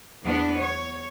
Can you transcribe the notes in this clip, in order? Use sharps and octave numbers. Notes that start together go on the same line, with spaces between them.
E2 B3 D4
C#5